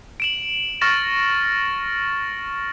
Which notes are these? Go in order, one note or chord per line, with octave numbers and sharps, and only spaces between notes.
D7 E7 F#7
C#6 F6 A6 A#6 C#7 E7